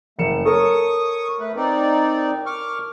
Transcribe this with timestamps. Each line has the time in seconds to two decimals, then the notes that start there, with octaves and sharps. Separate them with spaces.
0.19 F#1 A3 C#7 E7
0.45 A4 A#4 C#5 C#6 D#6
1.40 A3 B4
1.56 C4 D#4 D5
2.46 C#6 D6 F6